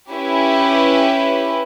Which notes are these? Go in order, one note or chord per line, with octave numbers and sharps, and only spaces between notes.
C#4 E4 G4 B4